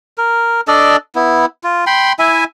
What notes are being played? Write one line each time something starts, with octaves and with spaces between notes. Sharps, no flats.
A#4
D4 A4 D5 D#5
B3 E4
F4
G5 B5 C6
E4 E5 G#5